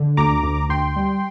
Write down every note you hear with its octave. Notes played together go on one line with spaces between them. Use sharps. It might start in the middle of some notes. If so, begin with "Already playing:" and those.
Already playing: D3
D2 A#5 D6
D2
D2 G5 C6
G3